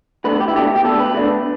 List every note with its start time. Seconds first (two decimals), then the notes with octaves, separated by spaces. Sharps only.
0.25 B2 A3 D4 B4
0.40 G4
0.48 E4
0.55 B2 A3 D4 G4
0.76 G4
0.85 B2 A3 D4 A4
1.00 B4
1.14 B2 A3 D4